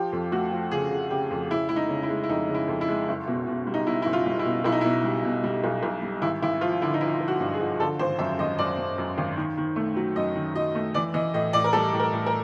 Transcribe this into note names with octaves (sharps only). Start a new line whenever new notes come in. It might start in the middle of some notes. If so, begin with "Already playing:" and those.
Already playing: F3 G4
F2
A3 F#4
F3
C#3 G#4
C#3
C#3 G4
F2
C#3 E4
G#3 E4
D#4
C#3
E4
G#3
E4
F2 D#4
C#3
E4
F2
E4
G#3
F#1
B2
B2
G3
D#4
B2 E4
F#1 E4
F4
G3
E4
B2
B1 E4
D#4
B2 E4
G3
B2
G3
B1
B1
G3
G#1 E4
G#1 E4
F3 F4
D3 E4
D#4
F3 E4
F3
F#4
G2
G#4
F3
D3 A4
G#1 C5
F#2 E5
G#1 D#5
F#2 D5
F#2
F#2
G#1
D#3
D#3
A3
F#3
F#2 D#5
D#3
F#3 D#5
A3
E3 D5
E3 D#5
A2 D#5
A2 D5
A#4
G3 A4
A2
A#4
A2
A#4